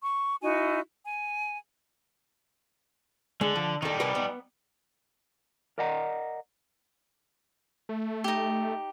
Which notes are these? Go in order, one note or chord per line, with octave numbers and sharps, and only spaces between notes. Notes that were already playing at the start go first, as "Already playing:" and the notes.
C#6
D#4 E4 F#4 G#5
G#5
D3 G#3
F3
D#3 G3 D#4 A4
C2 A#4 B4
B3
A#4 D5 D#5 F#5 A5 A#5
A3
D#4 G4